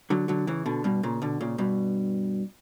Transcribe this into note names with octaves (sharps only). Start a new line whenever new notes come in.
D3 F#3
D3 F#3
C#3 E3
B2 D3
G2 B2
A#2 C#3
B2 D3
A#2 C#3
G2 B2